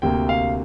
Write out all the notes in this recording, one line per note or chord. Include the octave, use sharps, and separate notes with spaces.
D2 C3 A#3 G5
F5